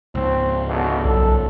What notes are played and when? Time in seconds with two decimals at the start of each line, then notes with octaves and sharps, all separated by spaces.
0.15 C#2 G#2 C4
0.68 E2 B2 D3
1.05 B1 F#2 A4